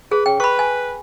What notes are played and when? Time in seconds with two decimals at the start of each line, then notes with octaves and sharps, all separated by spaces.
0.11 G#4 B4
0.26 C#3 G5
0.40 B4 B5 C#6
0.59 G#5